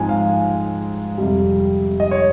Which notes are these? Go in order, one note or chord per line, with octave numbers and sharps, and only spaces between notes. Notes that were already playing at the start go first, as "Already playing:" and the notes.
Already playing: G#2 F3 G#3 C4 G#5
F5
F2 C3 G3
D#5
C#5